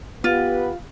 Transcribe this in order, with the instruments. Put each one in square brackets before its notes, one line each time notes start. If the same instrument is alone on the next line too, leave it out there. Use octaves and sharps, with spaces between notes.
[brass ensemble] B3 G4 B4 [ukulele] F4